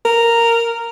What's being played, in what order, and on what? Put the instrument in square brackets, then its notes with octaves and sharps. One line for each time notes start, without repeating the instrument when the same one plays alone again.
[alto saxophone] A#4